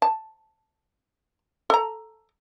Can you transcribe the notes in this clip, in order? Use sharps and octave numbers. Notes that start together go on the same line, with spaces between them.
A5
A4 A#5